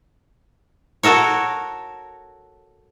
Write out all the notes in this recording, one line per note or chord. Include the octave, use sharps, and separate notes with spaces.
F#4 A4 A#4 C#5